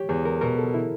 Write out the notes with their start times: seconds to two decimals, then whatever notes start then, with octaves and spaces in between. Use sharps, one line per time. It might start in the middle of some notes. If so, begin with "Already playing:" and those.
Already playing: G4 C#5
0.09 E2 G#4
0.25 A#4
0.41 B2 A#4
0.58 A4
0.74 E4